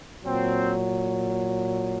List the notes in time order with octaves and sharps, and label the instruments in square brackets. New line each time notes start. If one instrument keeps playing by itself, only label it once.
[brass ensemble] A#2 F#3 C4